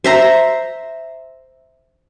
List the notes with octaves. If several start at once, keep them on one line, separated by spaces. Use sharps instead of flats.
C5 E5 A#5